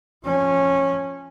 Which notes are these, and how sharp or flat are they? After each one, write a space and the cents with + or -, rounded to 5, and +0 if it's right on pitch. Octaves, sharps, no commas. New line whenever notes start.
F3 +0 C#4 -15